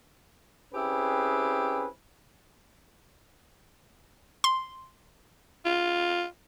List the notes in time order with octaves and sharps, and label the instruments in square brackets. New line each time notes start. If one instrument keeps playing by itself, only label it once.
[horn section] C4 C#4 E4 G4 G#4 B4
[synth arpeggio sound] C6
[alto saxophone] F4